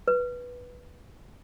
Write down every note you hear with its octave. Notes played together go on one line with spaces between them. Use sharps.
B4